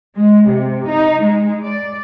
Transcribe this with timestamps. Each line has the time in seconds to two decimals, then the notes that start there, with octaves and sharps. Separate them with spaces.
0.18 G#3
0.49 C3
0.89 D#4
1.23 G#3
1.63 D5